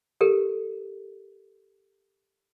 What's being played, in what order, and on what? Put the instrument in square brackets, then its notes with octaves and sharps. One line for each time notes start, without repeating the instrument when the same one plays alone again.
[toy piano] G4 A4 A#4